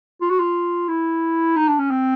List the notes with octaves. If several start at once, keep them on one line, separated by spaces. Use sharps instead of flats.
F4
F#4
F4
E4
D#4
D4
C#4
C4